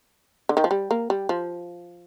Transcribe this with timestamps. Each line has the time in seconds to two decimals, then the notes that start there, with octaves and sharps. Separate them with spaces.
0.49 D3
0.57 D#3
0.64 F3
0.71 G3
0.91 A#3
1.10 G3
1.29 F3